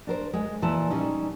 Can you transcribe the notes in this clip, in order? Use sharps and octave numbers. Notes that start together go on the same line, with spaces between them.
D4 A#4 C5
G#3
A#2 E3 A5
G3 C#4 D#4